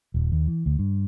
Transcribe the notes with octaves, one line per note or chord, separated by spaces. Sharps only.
D#1
D#2
E3
D2
G2